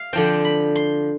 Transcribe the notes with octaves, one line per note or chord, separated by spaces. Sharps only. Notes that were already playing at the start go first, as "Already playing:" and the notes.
Already playing: F5
D3 F3 C4 G5
B5
C6